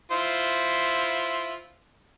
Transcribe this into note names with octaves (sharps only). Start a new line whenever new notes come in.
E4 F4 C5